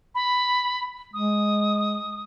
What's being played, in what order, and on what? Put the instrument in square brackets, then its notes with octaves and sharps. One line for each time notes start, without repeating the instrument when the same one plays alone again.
[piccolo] B5
[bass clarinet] G#3 [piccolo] D#6